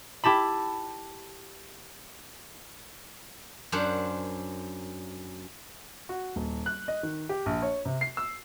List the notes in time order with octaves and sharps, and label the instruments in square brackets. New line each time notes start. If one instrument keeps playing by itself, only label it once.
[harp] E4 G4 A5 B5
[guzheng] F#2 D4 C5 F#5
[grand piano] F#4
D#1
F#6
D#5
D#3
G4
A#1
C#5
C3
C7
E6